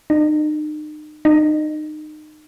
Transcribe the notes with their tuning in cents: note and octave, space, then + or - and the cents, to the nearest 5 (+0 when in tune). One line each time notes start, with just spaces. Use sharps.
D#4 -40
D#4 -30